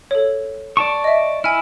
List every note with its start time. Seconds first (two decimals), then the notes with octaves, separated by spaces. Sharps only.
0.11 A4 C#5
0.77 D5 A5 C#6
1.04 D#5 E5
1.44 E4 G#5 F6